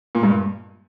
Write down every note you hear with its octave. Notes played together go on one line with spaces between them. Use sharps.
A#2
G2